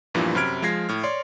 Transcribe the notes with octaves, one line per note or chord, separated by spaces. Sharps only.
E2 G2 A#2 E3 F3
F#2 C3 B5 F6 G#6 D7
F3 G#3 G#6 A#6 C7
A2 F6
C#5 D5 C6